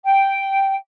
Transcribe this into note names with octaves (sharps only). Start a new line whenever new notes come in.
G5